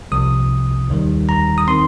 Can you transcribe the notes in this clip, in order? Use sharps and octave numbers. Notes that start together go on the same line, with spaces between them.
C2 C3 F3 D#6
D#2 D#3 G3
A#5
D#6
D#3 C4 C6